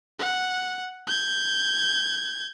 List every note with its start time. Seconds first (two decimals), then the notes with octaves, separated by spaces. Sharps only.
0.19 F#5
1.07 G6 G#6